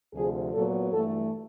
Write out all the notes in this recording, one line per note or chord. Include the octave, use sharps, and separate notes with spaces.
D2 C3 F3 G#4
A#2 F#3 B3 A4
G2 E3 A3 A4